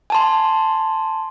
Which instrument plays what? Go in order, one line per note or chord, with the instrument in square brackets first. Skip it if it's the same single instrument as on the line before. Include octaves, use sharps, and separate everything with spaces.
[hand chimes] G#5 A5 C6